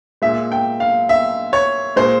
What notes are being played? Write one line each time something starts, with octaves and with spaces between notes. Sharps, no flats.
A#2 G#3 E5
G5
F5
E5
C#5
A#2 G#3 C5